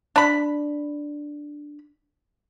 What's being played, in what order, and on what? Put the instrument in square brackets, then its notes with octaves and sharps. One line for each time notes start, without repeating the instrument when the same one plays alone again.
[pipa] D4 B5